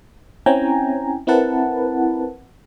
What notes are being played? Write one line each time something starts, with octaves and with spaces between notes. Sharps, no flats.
C4 C#4 E4 G5 G#5 A#5
C4 E4 A#4 B4 F#5 A5